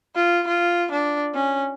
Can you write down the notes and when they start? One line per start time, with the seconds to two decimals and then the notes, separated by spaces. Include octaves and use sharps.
0.16 F4
0.48 F4
0.92 D4
1.35 C#4